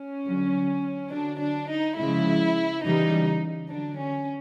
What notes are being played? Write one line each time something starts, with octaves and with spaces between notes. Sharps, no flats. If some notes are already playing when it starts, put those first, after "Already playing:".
Already playing: C#4
D3 F#3
D3 F#3 D4
D4
D#4
C#3 F3 G#3 E4
C#3 E3 G3 D#4
D3 F#3 D4
C#4